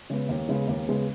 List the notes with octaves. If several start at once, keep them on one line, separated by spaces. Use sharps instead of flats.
C#3 G#3 B3
D#2
C#3 G#3 B3
D#2
C#3 G#3 B3